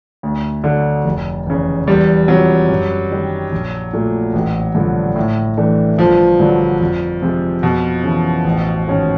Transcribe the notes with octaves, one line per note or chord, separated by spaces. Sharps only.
D2
D3 F#3
F1
E2 C#3
E2 G3
C3 F3 F#3
F#2
D#3 G3
A#1
A#2 F#3 A3
A1
G2 D3 F3
A2
E3 A3 D4
G1 F3
G2 D3 F#3
F2
C3 F3 G#3
F2 B2
C#3 E3
A1
G#2 D#3 G#3 C#4